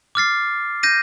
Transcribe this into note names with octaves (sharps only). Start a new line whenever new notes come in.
D6 F6 A6 C7
G6 A#6 D#7